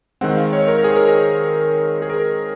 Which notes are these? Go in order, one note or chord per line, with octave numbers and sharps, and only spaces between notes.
D#3 G#3 C4 F#5
F5
C#5
A#4
G#4
A#4
G#4
G#4
A#4